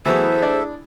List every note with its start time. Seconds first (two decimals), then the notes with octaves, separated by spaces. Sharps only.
0.06 E3 F#3 B3 E4 G#4 A4 C5 E5
0.42 D4